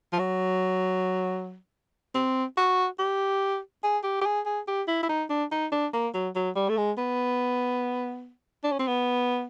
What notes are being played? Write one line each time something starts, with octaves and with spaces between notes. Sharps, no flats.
F3
F#3
C4
F#4
G4
G#4
G4
G4
G#4
G#4
G4
E4
E4
D#4
D4
D#4
D4
A#3
F#3
F#3
G3
A3
G#3
B3
D4
C#4
C4
B3